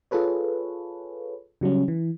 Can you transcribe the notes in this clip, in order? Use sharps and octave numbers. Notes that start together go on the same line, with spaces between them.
F4 G#4 A4 B4 C#5
C#3 F#3 G3 C#4
E3